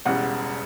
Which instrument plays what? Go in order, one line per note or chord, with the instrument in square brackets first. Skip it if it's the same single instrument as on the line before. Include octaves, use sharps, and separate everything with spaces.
[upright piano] E1 E2 C#3 G3 F#5